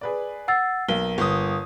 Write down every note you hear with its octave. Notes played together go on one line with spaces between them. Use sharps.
G#4 B4 D5
F#5 E6 A6 C7
B1 A#3 G7
G1 D#6